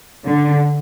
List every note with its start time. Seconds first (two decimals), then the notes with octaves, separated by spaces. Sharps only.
0.25 D3